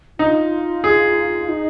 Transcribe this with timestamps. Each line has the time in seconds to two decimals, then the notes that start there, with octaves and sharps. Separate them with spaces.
0.19 D#4 F4
0.84 G#4
1.49 D#4